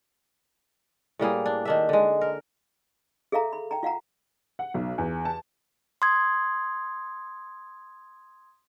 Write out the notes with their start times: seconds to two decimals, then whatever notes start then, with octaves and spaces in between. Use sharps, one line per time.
1.19 A2 G3 A#3 G#4
1.46 D4
1.65 D#3 D4 E5
1.89 D3 G#3
2.21 A#4
3.32 G#4 A4 E5 F5 A#5
3.53 B5
3.71 G5 A#5
3.83 F4 F5 F#5 A#5
4.59 F#5
4.74 B1
4.98 E2
5.25 A5
6.02 C6 D#6 G#6